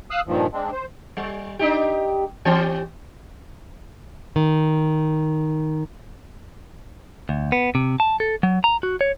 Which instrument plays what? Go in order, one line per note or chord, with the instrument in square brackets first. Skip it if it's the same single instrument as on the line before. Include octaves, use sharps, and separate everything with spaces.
[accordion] F5 D#6 E6 F#6
G2 A#2 D#3 F3
G#3 C4 D4
C5
[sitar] G3
D4 D#4 G4
E3 C4 G4
[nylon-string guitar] D#3
[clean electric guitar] D2
B3
C3
A5
A4
F#3
A#5
F#4
C#5